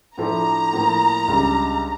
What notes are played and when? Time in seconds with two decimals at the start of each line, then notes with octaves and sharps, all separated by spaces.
0.17 A2 F3 A3 D4 A#5
0.73 A2 F3 A#3
1.28 C#2 C#3 G3 D4 G4